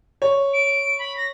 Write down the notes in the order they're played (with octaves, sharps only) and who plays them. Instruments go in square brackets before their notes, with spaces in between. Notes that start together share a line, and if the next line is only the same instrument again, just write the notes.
[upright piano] C#5
[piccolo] D7
B5
A#6